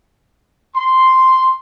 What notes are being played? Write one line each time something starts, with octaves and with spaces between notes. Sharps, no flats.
C6